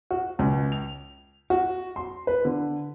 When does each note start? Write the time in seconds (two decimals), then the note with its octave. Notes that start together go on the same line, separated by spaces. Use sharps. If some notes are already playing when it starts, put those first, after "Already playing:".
0.11 F#4
0.39 C#2
0.72 F7
1.50 F#4
1.96 C6
2.27 B4
2.45 D3